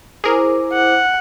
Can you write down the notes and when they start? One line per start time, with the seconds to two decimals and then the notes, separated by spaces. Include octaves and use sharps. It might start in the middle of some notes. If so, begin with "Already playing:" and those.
0.24 E4 G#4 A#4 C5 D6
0.73 F#5